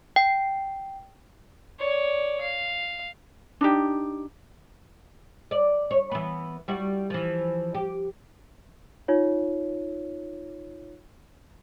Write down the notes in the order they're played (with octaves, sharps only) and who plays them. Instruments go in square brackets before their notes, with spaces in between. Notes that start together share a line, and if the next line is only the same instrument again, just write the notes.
[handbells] G5
[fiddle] C#5 D5
F5
[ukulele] D4 D#4 G4
[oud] D5
C#5
E3 B3
G3 E4 F#4
E3 F3
G4
[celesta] D#4 F4 C#5